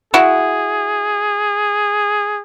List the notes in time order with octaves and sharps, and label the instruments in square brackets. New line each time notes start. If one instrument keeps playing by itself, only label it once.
[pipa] E4 F#4 [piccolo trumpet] G#4